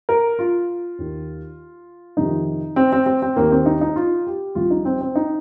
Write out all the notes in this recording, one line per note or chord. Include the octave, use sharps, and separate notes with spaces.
A#4
F4
D#2 D#3
F2 C3 D#3 D#4
C4
C4
C4
C4
D#2 D#3 A#3
C4
D#4
D#4
F4
G4
C2 C3 F3 F4
D#4
C4
C4
D#4